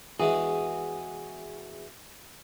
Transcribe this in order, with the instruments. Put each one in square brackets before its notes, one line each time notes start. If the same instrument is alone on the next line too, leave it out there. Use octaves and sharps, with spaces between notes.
[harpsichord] E2 E3 G#3 [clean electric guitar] F#4 G#4